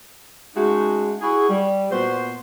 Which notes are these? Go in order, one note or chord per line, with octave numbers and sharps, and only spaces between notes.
G#3 A3 C#4 D#4 F#4
E4 F#4 G#4
G3
A#2 B3 F#4 C5